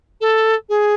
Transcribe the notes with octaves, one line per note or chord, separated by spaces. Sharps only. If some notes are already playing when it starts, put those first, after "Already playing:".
A4
G#4